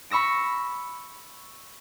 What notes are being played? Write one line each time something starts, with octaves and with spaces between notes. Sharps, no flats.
B5 C#6 E6 A#6 D7